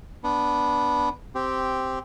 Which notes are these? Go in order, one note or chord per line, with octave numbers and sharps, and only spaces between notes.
B3 D4
C4 G4